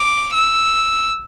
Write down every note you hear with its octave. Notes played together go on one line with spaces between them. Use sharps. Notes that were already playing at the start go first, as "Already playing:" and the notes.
Already playing: D6
E6